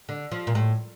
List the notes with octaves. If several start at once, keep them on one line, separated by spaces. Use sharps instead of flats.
D3
F3
A#2
A2